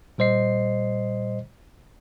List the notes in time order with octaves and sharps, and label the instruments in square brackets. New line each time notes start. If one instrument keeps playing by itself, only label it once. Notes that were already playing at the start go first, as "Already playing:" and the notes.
[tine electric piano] A#2 G3 C5 D#5 C7